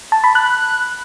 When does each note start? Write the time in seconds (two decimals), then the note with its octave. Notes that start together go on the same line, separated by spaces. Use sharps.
0.12 A5
0.24 B5
0.35 F#6